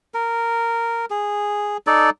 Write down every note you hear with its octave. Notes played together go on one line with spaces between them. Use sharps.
A#4
G#4
D#4 A4 D5